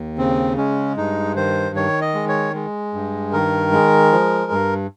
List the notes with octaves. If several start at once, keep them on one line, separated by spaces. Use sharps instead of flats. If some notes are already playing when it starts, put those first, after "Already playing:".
Already playing: D#2
C#3 C4
G#3 C#4
G2 D#4
D#3 C5
D#3 C#5
D#5
G#3
C#5
G#3
G2
D#3 A#4
G#3
F3
G2